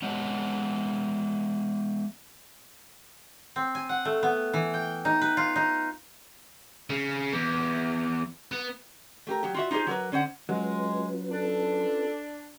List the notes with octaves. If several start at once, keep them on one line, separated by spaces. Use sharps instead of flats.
G#3 B3 C#5 D#5 F#5 A5
C4
G#5
F#5
A3
B3
E3
G5
D#4
B4
F4
D#4
C#3
E2
B3
A3 G4 A#4
F#3 G4
F4 F#4 E5
D#4 F4 G4 G#4 C5
F#3 A#4 B4
D3 C#4 C5 F#5
F#3 G#3 C#4 F4 B4
D4 A4